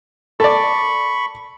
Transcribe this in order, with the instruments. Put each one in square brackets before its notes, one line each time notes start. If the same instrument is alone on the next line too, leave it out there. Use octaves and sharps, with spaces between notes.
[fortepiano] A4 D5 [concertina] B5 C#6